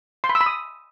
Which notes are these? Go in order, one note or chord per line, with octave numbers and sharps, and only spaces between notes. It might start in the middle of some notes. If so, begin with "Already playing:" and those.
C6
B5
E6
B5
D#6